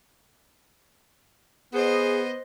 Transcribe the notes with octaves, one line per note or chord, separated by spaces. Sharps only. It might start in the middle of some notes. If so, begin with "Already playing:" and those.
B3 G#4 C5 D#5